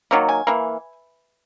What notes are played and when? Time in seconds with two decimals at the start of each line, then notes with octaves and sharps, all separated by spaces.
0.11 D#3 F#3 A#3
0.29 G#5
0.47 E3 A#3